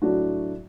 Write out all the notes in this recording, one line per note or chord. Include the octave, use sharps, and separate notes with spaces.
A2 F#3 A3 D4 F#4